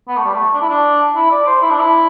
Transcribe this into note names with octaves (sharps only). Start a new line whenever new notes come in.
B3
A3
G3
A3
D4
E4
D4
E4
D5
C5
E4
D4
E4